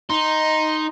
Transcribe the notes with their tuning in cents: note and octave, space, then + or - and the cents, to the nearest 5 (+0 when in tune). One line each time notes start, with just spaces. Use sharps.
D#4 +0 C6 +0